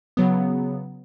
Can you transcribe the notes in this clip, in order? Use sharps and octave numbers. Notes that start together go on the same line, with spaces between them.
C#3 F#3 B3